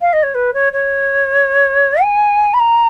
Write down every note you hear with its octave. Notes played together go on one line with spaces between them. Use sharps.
F5
D#5
C#5
B4
C#5
C#5
G#5
B5
A#5